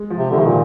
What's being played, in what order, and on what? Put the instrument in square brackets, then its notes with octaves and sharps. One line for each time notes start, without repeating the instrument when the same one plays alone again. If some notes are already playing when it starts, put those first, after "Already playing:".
Already playing: [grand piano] G#3
F3
[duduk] C3
[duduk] D3 [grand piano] D#3
[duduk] C3
A#2